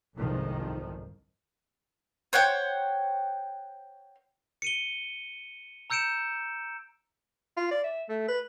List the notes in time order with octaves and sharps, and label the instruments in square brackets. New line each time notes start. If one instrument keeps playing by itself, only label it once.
[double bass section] G1 C2 F2 G#2 D#3 F3
[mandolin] C5 C#5 F#5 G5
[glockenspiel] C#7 D#7 G7
A#5 E6 G6 C#7 D7 E7
[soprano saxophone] F4
D5
E5
A3
B4